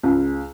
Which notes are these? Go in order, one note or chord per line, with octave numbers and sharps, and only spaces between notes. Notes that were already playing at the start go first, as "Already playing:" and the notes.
C#2